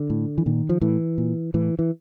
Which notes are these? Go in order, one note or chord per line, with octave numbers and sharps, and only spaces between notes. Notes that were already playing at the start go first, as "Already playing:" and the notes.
Already playing: D3
A2
E3
A#2 D#3
F3
A2 E3
A#2
A2 E3
E3